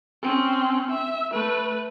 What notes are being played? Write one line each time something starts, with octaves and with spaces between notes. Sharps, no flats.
C4 C#4
E5
A3 B4